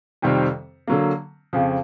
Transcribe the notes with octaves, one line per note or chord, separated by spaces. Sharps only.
F2 C3 D#3 G3 C4
D3 F#3 A#3
F2 C#3 F3